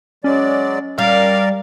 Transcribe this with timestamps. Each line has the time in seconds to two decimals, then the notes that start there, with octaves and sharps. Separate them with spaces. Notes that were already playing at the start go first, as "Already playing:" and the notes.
0.24 F#3 G#3 C#4 D5
0.98 G3 A#4 D5 F5